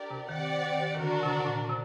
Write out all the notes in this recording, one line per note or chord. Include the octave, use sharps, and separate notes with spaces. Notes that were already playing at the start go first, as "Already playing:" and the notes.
Already playing: D4 G4 A#4 D5
C3
D#3 C4 G4 D5 F#5
D#3
D#3
D3 D4 F#4 A#4
C3
D3
C3
A#2
C3